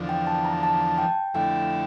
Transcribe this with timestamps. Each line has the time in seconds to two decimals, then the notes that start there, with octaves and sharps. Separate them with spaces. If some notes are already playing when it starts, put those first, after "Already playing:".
Already playing: E2 D3 F3
0.09 G5
0.27 A5
0.45 A#5
0.63 A5
0.81 A5
0.98 G5
1.34 F2 D3 A3 E4 G5